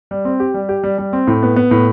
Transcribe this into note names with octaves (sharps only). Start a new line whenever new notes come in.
G3
C4
G4
G3
G4
G3
G3
C4
A2
B3
B3
A2